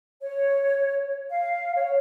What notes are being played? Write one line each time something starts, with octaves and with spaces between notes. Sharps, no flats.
C#5
F5
C#5